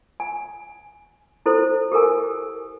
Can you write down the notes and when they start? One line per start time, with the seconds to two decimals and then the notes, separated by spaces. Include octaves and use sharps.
0.20 G#5
1.46 E4 A4 C5
1.92 G4 A4 A#4 G#5